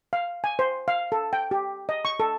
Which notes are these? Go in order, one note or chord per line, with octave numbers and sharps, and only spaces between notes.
F5
G#5
C5
F5
A4
G5
G4
D#5
C#6
A4